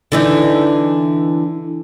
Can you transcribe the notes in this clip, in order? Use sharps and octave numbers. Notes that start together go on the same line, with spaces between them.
D3 E3 D#4